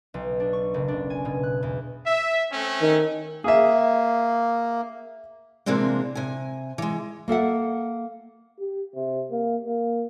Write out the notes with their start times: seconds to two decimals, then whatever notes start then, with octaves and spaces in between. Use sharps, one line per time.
0.14 B1
0.40 D4
0.53 C#6
0.74 F#1
0.88 D4
1.10 G#5
1.25 B2
1.43 F#6
1.63 E2
2.06 E5
2.51 A3 C4 C#4
2.82 D#3
3.44 A#3 G#4 E5
5.66 C3 E3 G#3 A#3 C4 D4
6.15 C3 G#5
6.78 E3 G#3
7.28 A#3 A4 E5 F#5
8.59 G4
8.95 C3
9.31 A#3
9.65 A#3